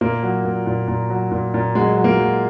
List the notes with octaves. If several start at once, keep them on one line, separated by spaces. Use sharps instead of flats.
A#2 A#3
F#3
A#2
A#2
A#2
F#3
A#2
A#2
F#3 G#3
F#3
A#3
F#3